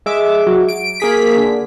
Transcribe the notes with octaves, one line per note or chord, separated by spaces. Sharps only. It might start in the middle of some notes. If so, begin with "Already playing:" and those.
G#3 E5 D6
F#3
D7
A#3 G#4 B6
D3